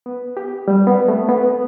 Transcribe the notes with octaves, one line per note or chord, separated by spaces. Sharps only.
B3
G4
G3
B3
A3
B3